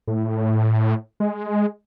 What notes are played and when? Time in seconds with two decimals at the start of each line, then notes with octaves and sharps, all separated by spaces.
0.08 A2
1.20 G#3